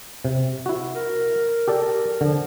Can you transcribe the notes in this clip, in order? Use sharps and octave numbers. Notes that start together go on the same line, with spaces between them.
C3
E4 F#4
A#4
G4 A4 D5
D3 F3